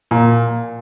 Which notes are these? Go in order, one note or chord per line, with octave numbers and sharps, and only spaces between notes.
A#2